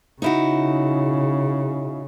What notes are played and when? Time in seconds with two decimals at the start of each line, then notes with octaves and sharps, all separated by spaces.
0.22 C#3 D#4 E4 F#4